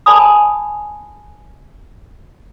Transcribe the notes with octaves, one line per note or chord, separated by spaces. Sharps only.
D5 G#5 A5 B5 D#6